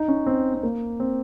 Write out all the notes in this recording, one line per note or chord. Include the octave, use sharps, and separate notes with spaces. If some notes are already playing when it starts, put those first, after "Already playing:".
Already playing: D#4
C#4
C4
C4
A#3
C4